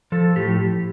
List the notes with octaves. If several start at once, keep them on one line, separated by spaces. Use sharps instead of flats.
F3 A4
A2 G4